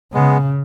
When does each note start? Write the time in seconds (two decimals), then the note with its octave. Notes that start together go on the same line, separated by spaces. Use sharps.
0.14 C#3 G#3 B3